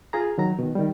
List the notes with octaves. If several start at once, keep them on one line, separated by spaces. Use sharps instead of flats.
F4 G#4 A#5
D#3 F#3 A#5
B2 D#3
D#3 G3